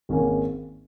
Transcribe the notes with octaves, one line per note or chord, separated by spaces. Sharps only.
G#1 G#2 D#3 A#3 C#4